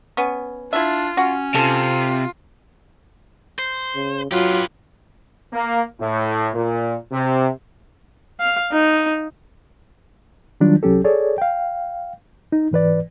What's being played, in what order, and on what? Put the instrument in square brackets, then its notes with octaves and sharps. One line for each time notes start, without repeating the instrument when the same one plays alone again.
[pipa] B3 C#4
[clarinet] D4 [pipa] E4 E5 [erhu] F4
[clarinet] C#4 [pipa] F#4
[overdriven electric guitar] C3 [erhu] F4 [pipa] A4
[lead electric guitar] C5
[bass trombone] C#3
[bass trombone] F#3 [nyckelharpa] F4 [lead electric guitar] G4 B4
[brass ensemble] A#3
A2
A#2
C3
[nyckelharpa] F5
D#4
[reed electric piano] D#3 F#3 G3 D4 F4
C2 F#3 C#4 G4 A4
G#4 A4 C#5 D5
F5 G5
D#4
G#2 E3 B4 D5